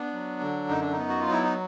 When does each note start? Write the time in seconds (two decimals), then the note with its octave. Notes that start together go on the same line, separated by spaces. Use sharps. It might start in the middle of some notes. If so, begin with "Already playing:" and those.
Already playing: B3 D4
0.13 F#3
0.40 D3
0.69 F#2 D#4
0.81 D4
0.92 B3 D#4
1.09 F#4
1.20 F4
1.25 F#3
1.31 E4
1.43 D#4